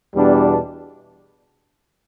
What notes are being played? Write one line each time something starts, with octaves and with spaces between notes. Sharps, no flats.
E2 B2 G3 D4